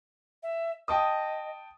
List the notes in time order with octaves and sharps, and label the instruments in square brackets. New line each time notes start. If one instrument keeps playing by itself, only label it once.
[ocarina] E5
[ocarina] D#5 [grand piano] G5 A5 D#6